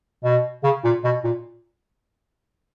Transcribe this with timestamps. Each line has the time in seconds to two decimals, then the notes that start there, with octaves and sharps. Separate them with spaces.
0.24 B2
0.64 C#3
0.84 A#2
1.04 B2
1.24 A#2